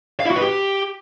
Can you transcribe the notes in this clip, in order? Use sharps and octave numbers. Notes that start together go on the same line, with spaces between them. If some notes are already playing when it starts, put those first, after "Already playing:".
F5
E4
F#4
B4
G4